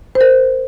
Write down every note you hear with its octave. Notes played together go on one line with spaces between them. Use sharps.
C5
A#4